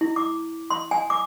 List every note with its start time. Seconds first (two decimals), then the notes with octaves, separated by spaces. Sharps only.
0.01 E4
0.16 D6
0.70 C6
0.91 G#5
1.10 D6